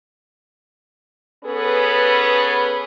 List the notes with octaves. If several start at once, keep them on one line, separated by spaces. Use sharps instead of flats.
B3 C#4 G#4 A4 B4